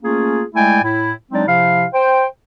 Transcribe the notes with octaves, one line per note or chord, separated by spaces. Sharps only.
A3 A#3 C#4 F4 G#4
G#3 A3 E4 D5 G5 G#5
A2 E4
F#3 G#3 C4 D4 D#4 D5
C3 F3 E4 F5
C5 G5